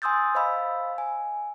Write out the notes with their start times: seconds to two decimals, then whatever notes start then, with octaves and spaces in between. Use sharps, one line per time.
0.02 G#5 C6 D#6 E6 G6 A6
0.35 C5 D#5 F5 B5 E6
0.98 G#5